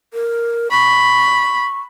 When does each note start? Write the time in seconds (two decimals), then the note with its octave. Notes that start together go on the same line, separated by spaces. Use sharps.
0.14 A#4
0.71 B5 C#6